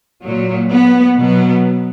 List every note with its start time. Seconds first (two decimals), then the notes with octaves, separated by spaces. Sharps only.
0.22 A#2 F#3
0.70 B3
1.17 B2 F#3 B3